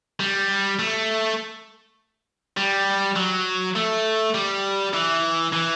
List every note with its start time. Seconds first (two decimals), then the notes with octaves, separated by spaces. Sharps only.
0.20 G3
0.79 A3
2.57 G3
3.16 F#3
3.75 A3
4.34 G3
4.93 E3
5.53 E3